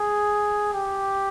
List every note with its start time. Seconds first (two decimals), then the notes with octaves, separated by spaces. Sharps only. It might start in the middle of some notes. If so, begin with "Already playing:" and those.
Already playing: G#4
0.73 G4